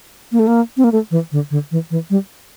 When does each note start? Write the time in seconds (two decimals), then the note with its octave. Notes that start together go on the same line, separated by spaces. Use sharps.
0.32 A#3
0.39 A3
0.47 A#3
0.77 C4
0.84 A#3
0.92 A3
1.11 E3
1.32 D3
1.51 D3
1.71 E3
1.91 E3
2.10 G3